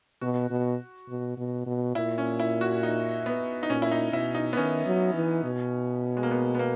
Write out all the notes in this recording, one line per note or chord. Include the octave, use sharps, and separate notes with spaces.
B2 F#4
B2
B2
B2
B2
A#2 E4
C#4
E4
F#4
D#4
B3
D#4
A#2 C#4
E4
D#4
B2 E4
D#4
B3
D#3 C#4
F#3
E3
B2
G#3
A#3
B3
B3
A#3